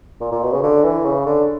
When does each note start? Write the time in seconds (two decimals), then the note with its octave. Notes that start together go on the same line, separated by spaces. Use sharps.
0.21 A#2
0.32 A#2
0.43 B2
0.53 C#3
0.63 D3
0.83 E3
1.05 C#3
1.26 D3